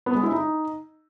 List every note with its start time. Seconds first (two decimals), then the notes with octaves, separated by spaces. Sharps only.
0.06 B3
0.15 G#3
0.23 E4
0.32 D#4